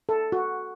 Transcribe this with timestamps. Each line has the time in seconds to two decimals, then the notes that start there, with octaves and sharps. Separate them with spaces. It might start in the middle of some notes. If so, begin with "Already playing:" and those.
0.09 A4
0.32 F#4